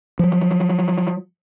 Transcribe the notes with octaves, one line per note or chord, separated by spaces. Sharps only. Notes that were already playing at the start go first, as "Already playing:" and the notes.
F3 F#3